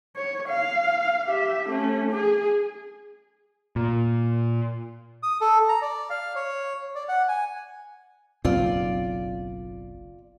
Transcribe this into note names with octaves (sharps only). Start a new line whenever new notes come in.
C#5
F5
G4 E5
A3 C#4
G#4
A#2
D#6
A4
A#5
D5
F5
C#5
D5
F#5
G#5
F#1 B1 C4 F4 D5